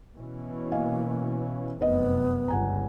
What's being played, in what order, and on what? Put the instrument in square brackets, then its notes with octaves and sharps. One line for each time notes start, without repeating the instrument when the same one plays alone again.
[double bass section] B2 E3 C#4
[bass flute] A#3 [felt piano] D#5 F5 G#5
[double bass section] F1 F#2 C3 [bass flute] B3 [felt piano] B4 D#5
[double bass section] G1 C#2 G2 [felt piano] F#5 G#5 A#5